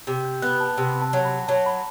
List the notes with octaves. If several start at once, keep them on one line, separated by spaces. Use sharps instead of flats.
C3
G6
B3 F#6
A5
C3 G5
A5
F#3
B5
F#3 A5
B5